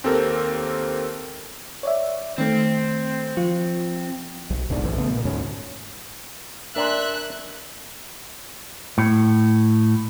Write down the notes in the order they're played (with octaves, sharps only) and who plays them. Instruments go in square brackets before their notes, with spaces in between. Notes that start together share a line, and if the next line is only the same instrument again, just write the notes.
[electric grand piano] D#2 C4 G4 A4 A#4
[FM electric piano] C#5 D5 E5
[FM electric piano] D#3 A3 [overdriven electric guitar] C4
[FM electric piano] F3 F4
[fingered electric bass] B1
D#1 C2 G#2 D4
F#1 B1 A2 E3
C#3 A3 B3
A#2
D2 G#2 C#4
[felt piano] D4 G#5 C6 [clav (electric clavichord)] A#4 D5 [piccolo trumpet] E5 [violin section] F#6
[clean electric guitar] A2